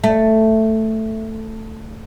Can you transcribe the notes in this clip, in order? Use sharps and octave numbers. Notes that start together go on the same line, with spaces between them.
A3